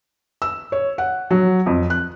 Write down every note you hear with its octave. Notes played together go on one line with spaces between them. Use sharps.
E6
C#5
F#5
F#3
F2
F#6